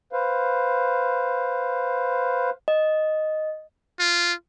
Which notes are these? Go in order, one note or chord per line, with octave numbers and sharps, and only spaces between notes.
B4 C5 F5
D#5
F4